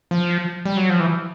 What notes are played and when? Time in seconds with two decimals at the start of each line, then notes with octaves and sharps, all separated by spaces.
0.11 F3
0.65 G3
0.77 F#3
0.89 F3
1.00 E3